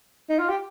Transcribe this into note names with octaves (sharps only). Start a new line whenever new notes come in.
D#4
F4
G4